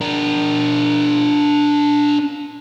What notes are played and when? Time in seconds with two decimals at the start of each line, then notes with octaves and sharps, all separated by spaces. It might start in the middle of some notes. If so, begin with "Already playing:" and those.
0.01 D4 A#4